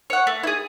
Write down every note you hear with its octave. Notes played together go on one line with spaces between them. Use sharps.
C#5 F#5
A3
E4
G#4